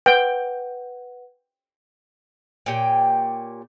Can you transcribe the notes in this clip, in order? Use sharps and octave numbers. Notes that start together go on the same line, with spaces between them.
B4 F#5 G5
A#2 G4 C#5 G5